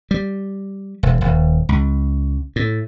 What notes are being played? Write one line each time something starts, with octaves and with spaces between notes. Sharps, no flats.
G3
E1
D#1
C#2
A2